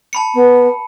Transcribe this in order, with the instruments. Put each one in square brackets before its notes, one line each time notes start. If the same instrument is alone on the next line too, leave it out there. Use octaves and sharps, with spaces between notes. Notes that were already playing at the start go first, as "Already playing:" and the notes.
[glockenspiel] A5 B5 C#7
[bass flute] B3